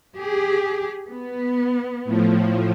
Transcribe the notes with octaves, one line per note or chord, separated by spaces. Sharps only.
G4 G#4
B3
A2 F3